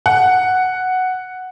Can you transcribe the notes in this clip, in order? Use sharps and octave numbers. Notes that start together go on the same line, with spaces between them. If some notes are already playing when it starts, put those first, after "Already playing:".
F#5